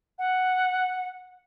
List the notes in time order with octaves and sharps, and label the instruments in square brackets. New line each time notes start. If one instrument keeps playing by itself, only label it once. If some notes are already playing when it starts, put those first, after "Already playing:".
[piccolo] F#5